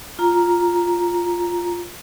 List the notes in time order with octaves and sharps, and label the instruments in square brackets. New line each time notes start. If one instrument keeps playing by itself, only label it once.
[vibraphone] F4 A#5